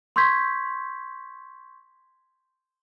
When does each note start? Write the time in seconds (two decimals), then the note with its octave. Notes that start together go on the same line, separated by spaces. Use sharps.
0.16 C6 C#6 E6 G6 G#6 B6